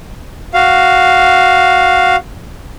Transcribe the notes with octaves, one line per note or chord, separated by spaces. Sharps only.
F#4 F5